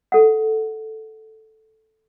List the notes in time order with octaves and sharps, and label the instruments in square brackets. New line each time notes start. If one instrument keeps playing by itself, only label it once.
[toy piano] A4 F#5